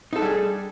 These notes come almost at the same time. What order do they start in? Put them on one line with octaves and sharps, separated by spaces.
D#4 A4 D4 G3 G#4